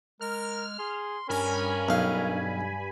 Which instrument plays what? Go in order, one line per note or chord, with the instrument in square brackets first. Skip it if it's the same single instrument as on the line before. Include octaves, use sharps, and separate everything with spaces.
[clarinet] G#3 [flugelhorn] A#4 [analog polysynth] F6
[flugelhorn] G#4 [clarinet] C6
[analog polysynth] G2 G#5 B5 [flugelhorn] C#4 [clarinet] A#4
[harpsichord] B1 F5